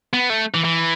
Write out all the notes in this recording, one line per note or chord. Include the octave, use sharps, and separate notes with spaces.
B3
A3
E3
E3